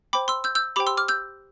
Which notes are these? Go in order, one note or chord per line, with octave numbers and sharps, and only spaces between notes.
C5 G5 B5 D6
C6 E6
E6 G6
E6 G6
G4 C5 G5 B5 D6
C6 E6
D6 F6
E6 G6